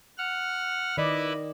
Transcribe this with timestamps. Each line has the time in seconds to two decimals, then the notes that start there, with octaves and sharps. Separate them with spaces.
0.18 F#5 F6
0.97 D#3 E4 B4 D5 D#5